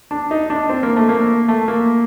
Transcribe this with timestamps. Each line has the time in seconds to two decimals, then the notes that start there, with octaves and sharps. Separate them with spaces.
0.11 D4
0.31 D#4
0.50 D4
0.69 C4
0.83 A#3
0.96 A3
1.09 A#3
1.48 A3
1.68 A#3